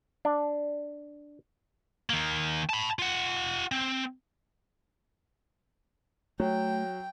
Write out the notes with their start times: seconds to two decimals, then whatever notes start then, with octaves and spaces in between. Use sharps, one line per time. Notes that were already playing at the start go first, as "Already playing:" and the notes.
0.25 D4
2.10 D#3 A#3
2.69 A5 B5
2.99 F4 F#5
3.72 C4
6.40 F#3 A3 G5